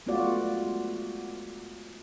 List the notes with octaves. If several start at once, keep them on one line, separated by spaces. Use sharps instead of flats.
G#3 A3 B3 F4 F#4 D5